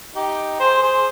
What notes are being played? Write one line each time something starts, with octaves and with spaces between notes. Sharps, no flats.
D#4 G4
G#4 C5
G#4 C5